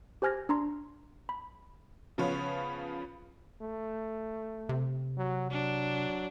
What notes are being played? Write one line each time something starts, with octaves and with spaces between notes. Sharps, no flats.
G4 C5 G#5 F6 G#6 A#6
D4 A#5 C6
B5
C#3 F3 B3 F4 B4 C#5
A3
C3
F#3
F#3 D4